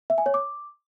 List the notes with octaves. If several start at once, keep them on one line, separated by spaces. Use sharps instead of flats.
E5
G#5
C#5
D6